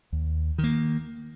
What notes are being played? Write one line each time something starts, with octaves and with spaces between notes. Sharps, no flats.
D#2
D#3
A#3